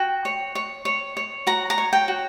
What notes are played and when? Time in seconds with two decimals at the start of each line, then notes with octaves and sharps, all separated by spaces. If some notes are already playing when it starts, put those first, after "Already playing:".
Already playing: F#4 G5
0.25 C#5
0.55 C#5
0.85 C#5
1.17 C#5
1.47 F#4 A#5
1.70 A#5
1.78 C#5
1.93 G5
2.08 F#4